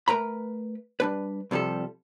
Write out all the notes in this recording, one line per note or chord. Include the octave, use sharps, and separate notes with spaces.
A3 A#4 B4 A#5 B5
G3 D4 B4
C2 C3 F3 G3 A4